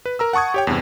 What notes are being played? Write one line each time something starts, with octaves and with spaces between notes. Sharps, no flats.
B4
A#4 A#5 E6
F#5 A5 C#6 D#6 G#6
G4 C#5 G5
E2 G2 C3